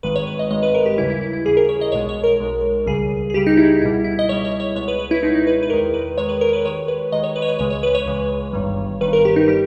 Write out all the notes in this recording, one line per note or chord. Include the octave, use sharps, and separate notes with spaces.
G#1 G2 D#3 G#3 B4
C#5
B4
D#5
G#1 G2 D#3 G#3 D#5
B4
A#4
G4
D#2 C#3 E3 G3 E4
E4
E4
E4
D#2 C#3 E3 G3 G#4
A#4
C#5
D#5
B1 B2 G#3 C#5
C#5
A#4
B1 B2 G#3
C#2 C#3 G3 G#4
G#4
C#2 C#3 G3 G4
D#4
E4
C#2 B2 G3 E4
E4
D#5
C#2 B2 G3 C#5
C#5
C#5
C#2 B2 G#3 C#5
B4
B4
E4
C#2 B2 G#3 D#4
D#4
B4
B4
E2 D#3 G#3 A#4
B4
E2 D#3 G#3 C#5
B4
A#4
B4
D#2 D#3 G#3 C#5
B4
D#2 D#3 G#3 D#5
C#5
B4
C#5
B4
C#2 C#3 E3 G#3 C#5
C#5
B4
C#5
C#2 C#3 E3 G#3
G1 G2 D#3 G3
G1 G2 D#3 G3 B4
A#4
G4
D#4
G3 G4